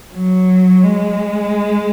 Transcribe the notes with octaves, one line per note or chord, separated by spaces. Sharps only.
F#3
G#3